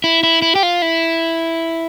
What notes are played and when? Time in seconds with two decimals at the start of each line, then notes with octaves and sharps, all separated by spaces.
0.04 E4
0.23 E4
0.42 E4
0.55 G4
0.63 F4
0.82 E4